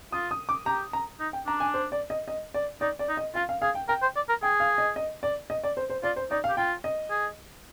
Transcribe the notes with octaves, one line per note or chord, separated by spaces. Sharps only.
F4 D#6
D#6
D6
G4 A#5
A#5
D#4
G5
D4 A#5
G#5
C5
D5
D#5
D#5
D5
D#4 D5
D5
D#4
D#5
F4 F5
F5
G#4 F5
G5
A#4 G5
C5
D5
A#4
G#4 G5
F5
D#5
D#5
D5
D#5
D5
C5
C5
F4 D5
C5
D#4 D5
F5
G4
F4 G5
D#5
G#4